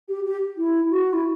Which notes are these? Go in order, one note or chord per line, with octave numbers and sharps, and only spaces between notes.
G4
G4
E4
F#4
E4